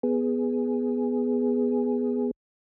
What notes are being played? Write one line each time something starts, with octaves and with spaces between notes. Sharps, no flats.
B3 G#4